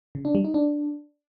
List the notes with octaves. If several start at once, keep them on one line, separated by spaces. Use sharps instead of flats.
C#3
D4
G3
D#4
D4